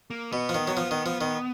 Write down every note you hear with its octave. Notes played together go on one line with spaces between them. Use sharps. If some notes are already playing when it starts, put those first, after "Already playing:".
A#3
B2 B3
F3
D#3
F#3
F3
D#3
F3
D#3